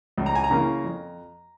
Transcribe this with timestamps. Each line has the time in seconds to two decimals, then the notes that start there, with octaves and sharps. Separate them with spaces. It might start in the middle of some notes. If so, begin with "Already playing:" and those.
0.18 C#2
0.26 A#5
0.35 G#5
0.44 A#5
0.51 C#3 E3 A#3
0.84 F2